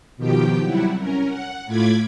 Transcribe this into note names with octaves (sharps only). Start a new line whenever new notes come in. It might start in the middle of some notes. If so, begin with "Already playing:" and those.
B2 D#3 F3 G4 G5
C3 F#3 G3 E4 F#4
C#4 A#4
F#5
A2 A3 F4 B5 D6 G#6